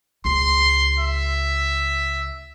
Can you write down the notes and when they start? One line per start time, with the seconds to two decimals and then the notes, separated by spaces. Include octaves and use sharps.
0.25 C#2 C6
0.98 E5